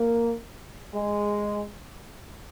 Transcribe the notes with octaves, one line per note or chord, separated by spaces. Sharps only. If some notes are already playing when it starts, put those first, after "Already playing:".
Already playing: A#3
G#3